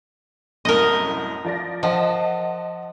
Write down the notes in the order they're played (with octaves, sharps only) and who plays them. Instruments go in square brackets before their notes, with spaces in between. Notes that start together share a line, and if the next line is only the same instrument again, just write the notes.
[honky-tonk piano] C2 F#2 A2 [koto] A#4 D#5
[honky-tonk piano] F3 D5 A#6
[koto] F3 [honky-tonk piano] D#5 F#5 A5